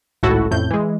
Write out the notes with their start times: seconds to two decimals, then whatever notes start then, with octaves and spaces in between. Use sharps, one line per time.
0.23 G#1 C#2 A2 E4 F#4 A4
0.51 A1 F2 A2 G6
0.71 E3 G#3